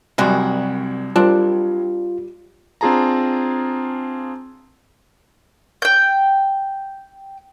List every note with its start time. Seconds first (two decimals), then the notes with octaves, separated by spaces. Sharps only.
0.18 C2 F#2 C3 G3 G#3 F#4
1.16 G3 C4 D4 F4 A#4
2.81 C4 D4 F4 G#4 A5 A#5
5.82 G5 G6